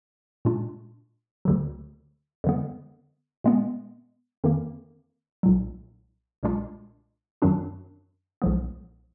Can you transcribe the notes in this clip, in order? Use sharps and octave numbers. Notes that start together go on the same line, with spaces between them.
A#2 G#3 D4 F4
D2 D3 F#3
F2 D3 G#3 B3
A#2 G#3 B3
F2 D#3 A#3
B1 A#2 F#3
B1 A#2 G#3 D4 F4
F#2 D#3 F#3 D4 F#4
B1 A#2 F3 G#3 B3